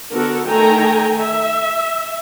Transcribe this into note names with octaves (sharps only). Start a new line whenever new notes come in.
D3 B3 F#4 A4 A#4
D#3 A3 A4 G5 G#5 A#5
E5